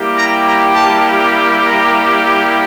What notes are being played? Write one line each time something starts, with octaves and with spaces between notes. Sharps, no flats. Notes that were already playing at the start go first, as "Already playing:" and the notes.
Already playing: G3 A#3 E4 G4
A#5
A#5
A5
A#5